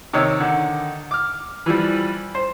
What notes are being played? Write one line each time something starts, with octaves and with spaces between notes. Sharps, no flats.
C3 D#3 C#5 E6
D3 D#3
D6 F6
E3 F3 G3
C5